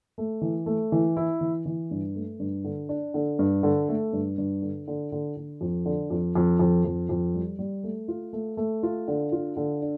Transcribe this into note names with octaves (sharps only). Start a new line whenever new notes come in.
A3
E3
A3
E3
E4
E3
E3
G2
A3
G2
D3
D4
D3
G2
D3
A3
G2
G2
D3
D3
D3
D3
F2
D3
F2
F2
F2
F2
F2
G3
G3
A3
F4
A3
A3
F4
D3
F4
D3
D4